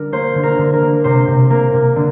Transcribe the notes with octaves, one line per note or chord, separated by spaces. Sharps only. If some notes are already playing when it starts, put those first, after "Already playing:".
Already playing: D3 G3 A#4
A#3 C5
D3
A#4
D3
A#4
A#3
C3 C5
C3
A#3 A#4
C3
D3